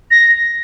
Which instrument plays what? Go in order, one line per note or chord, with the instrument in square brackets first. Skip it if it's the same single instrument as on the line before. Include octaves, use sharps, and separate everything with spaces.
[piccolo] A#6